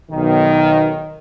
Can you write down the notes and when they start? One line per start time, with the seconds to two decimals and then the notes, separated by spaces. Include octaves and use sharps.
0.12 B1 D#3